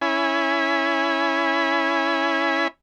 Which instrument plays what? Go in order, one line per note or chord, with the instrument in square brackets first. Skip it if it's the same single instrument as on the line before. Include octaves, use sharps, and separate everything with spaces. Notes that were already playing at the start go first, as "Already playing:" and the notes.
[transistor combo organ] C#4 E4 G#5 B5